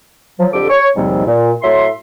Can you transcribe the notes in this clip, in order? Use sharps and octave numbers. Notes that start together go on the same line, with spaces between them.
F3 F#3
F2 D3 G4 A4 D6
C#5 C#6
D#2 G#2 B2 F3 G3 C4
A#2
A2 F#3 E5 C6